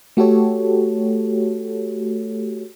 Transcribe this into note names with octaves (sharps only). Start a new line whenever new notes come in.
A3 F#4 G4 A4 C#5